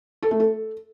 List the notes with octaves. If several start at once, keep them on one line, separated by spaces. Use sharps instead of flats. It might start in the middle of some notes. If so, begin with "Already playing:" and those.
A4
A3
A4